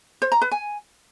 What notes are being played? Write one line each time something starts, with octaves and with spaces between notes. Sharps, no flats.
C5
A#5
B4
G#5